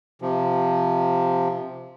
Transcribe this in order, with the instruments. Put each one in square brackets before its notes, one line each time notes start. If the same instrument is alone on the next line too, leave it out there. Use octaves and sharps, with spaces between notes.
[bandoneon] C3 F3